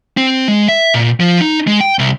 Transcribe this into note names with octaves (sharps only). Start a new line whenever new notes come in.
C4
G#3
E5
A#2
F3
D#4
G#3
G5
C2